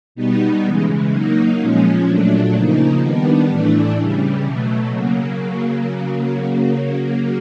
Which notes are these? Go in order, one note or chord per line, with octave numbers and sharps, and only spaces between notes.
B2 G3 B3 D#4
C#3 E3 G#3
F#3 A#3 D#4
A#2 F3 G#3 C#4
A#2 F#3 A3 D4
C#3 F3 A#3 D#4
D#3 G3 B3 D4
A2 E3 A3 D4
C#3 E3 G3
B2 F#3 A3
C#3 F#3 A#3